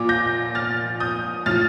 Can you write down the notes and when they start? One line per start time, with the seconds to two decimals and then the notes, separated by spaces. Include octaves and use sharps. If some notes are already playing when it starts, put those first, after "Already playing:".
Already playing: A#2 F3 D6
0.09 G6 A#6
0.55 F6 A6
1.00 D#6 G6
1.46 A2 F3 F6 A6